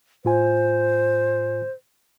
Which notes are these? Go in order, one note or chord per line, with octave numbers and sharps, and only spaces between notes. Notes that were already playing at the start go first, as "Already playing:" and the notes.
A2 F4 C5 G#5